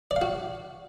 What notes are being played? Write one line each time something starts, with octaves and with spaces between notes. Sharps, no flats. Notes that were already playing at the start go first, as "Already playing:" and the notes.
D5
F5
F#4